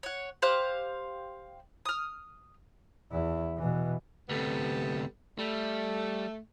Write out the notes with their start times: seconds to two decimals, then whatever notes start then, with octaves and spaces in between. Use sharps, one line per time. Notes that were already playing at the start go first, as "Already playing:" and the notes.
0.03 C#5 F#5
0.42 G4 C5 F5 F#6
1.86 D#6 F6
3.12 E2 E4
3.57 B2 E3
4.29 D2 C3 G3 B3 A4
5.39 G3 A3